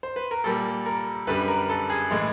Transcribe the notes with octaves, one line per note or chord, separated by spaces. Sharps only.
C5
B4
A#4
A#2 G3 A#3 A4
A#4
F#2 D3 G3 B4
A#4
A4
G#4
A2 E3 G#3